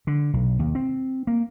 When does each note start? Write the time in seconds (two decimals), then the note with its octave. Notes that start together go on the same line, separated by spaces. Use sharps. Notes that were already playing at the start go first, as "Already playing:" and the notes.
0.07 D3
0.33 B1
0.59 D#2
0.75 C4
1.27 A#3